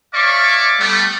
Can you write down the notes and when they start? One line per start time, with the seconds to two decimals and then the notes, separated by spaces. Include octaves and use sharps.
0.14 C#5 D5 E5 F5 C#6 D6
0.80 G3 A3 B3